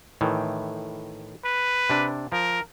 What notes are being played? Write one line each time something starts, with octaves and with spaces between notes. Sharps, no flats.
A2 D#3 E3
B4
C3 D4
F3 A#4